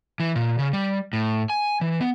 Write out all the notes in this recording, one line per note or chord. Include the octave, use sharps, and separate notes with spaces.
E3
A#2
C#3
G3
A2
G#5
E3
B3